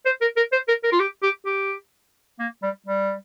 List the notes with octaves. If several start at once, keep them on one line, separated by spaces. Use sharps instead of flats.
C5
A#4
A#4
C5
A#4
A#4
F4
G4
G4
G4
A#3
G3
G3